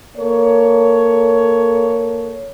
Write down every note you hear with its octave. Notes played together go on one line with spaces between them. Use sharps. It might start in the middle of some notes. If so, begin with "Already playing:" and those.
A#3 A4 C#5